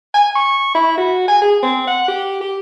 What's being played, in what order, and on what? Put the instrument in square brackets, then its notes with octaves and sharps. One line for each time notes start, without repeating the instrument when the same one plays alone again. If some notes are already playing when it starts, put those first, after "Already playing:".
[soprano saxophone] G#5
C#6
E4
F#4
G#5
G#4
C4
F#5
G4
G4